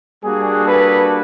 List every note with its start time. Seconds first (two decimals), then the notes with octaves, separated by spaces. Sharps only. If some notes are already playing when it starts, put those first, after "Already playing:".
0.23 G3 A#3 D4 F#4 G#4
0.65 A4 B4